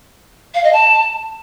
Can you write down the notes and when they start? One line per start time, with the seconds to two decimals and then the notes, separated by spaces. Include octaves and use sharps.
0.54 F5
0.63 D#5
0.73 A5